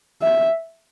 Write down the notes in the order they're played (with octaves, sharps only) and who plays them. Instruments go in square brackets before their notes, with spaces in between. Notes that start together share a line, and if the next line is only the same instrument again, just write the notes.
[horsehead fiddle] E5